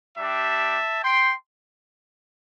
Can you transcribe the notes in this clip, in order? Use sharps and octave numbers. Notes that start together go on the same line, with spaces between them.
G3 D4 G4 E5 A5
G5 C6